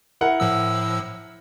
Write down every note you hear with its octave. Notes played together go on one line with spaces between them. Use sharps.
E4 A#4 F#5
A2 F3 E6